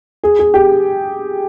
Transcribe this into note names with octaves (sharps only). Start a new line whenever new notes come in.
G#4
G#4
G4